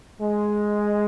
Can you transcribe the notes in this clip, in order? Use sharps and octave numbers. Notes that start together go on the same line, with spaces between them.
G#3